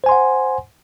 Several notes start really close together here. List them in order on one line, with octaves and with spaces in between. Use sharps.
C5 G#5 C6 F#5